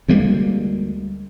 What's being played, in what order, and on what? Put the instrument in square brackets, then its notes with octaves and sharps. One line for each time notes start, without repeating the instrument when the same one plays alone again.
[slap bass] D2 G3 G#3 A#3